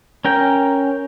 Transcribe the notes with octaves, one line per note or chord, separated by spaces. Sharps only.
C#4 A#4 G5